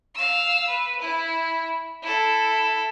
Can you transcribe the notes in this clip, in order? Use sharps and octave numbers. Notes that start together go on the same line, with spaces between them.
F5 E6
B4
E4
E4 A4